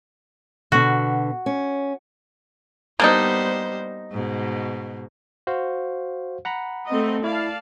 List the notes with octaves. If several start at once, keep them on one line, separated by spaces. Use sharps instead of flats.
B2 D3 F#4
C#4
G3 A#3 B3 D4 D#4 C5
G#2 B2
F#4 C5 F5
F#5 A#5 B5
A3 C4 D#5
E4 D5 F5 A5